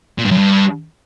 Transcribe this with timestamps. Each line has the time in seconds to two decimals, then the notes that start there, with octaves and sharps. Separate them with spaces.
0.18 A#2
0.25 G2
0.31 F#2
0.37 G2